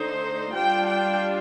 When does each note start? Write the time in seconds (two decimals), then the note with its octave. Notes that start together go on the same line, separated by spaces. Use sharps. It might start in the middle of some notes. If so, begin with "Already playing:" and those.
Already playing: D3 A3 D#4 C5
0.54 G3 D4 F4 G5
0.87 G5